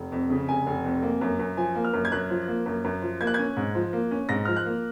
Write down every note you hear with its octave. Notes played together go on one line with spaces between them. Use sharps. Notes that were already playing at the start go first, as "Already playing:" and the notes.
Already playing: F1
F2
C#3
F1 G#5
F1
F2
A#3
F#2
F#2
F3 G#5
A#3
F6
F#2
G#6
F#2 F#6
F3
A#3
F#2
F#2
F3
A#3 G#6
F#6
C#4 G#6
G#2
F3
A#3
C#4
G#2 A#6
F3 F6
F#6
A#3